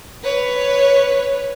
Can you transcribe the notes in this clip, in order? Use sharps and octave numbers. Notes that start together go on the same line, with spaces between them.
B4 C#5